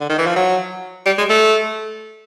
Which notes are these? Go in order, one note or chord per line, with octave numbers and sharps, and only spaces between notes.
D3
D#3
E3
F3
F#3
G3
G#3
A3